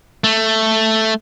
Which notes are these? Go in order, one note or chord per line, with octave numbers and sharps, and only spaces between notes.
A3